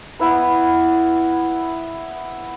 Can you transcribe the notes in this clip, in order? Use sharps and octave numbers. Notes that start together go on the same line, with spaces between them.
B3 E4 B4